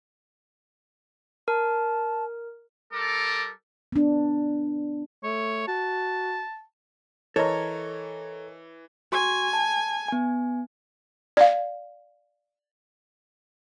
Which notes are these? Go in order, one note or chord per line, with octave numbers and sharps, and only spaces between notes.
A#4 A5
G3 A4 A#4 D6
B3 D4
A3 C#5
F#4 A5
E3 A4 A#4 C#5 D#5 A5
F#4 G#5 C6 C#6
A5
B3 G#5
D5 F5